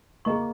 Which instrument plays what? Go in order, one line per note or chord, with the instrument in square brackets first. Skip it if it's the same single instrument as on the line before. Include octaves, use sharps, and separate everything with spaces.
[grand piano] A#3 [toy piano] G#4 D#5 A#5 C#6